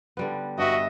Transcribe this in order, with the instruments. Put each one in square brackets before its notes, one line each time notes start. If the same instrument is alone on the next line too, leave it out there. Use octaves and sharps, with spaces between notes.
[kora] D3 G3 B3
[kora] G2 [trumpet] F#4 [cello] D#5 E5